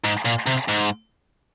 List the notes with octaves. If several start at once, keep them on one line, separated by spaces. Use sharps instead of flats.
G#2
A#2
C3
G#2